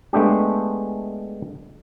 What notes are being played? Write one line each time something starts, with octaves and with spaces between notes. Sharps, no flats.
G#3 A3 B3 D4 G4